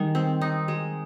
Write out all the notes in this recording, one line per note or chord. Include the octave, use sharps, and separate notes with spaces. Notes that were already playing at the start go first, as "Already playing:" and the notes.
Already playing: D#3 G3 G#3 D#4
C4
D#4
G#3